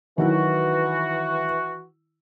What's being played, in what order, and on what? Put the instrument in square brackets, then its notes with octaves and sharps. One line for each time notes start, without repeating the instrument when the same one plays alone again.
[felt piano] D#3 F#3 E4 [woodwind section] E3 F#4